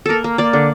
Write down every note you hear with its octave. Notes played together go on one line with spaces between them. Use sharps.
A#3 A4 A#4
A#3
A#3 D5
D3